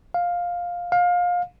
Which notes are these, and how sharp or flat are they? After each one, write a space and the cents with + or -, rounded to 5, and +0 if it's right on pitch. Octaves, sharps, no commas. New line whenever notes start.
F5 +10
F5 +25